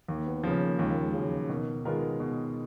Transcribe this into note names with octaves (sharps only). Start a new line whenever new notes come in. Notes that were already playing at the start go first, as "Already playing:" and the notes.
D#2 A#3
B3
C#3 F3 B3
A#3
D#2 G#3
A#3
G#3
C#3 F3 F#3
B2 D#3
D#3 G#3 B3 F4 A#4
B2